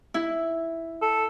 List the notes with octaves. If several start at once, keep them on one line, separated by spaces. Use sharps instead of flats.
E4
A4